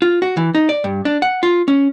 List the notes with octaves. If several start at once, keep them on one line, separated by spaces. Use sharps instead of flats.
F4
F#4
E3
D#4
D5
G2
D4
F#5
F4
C#4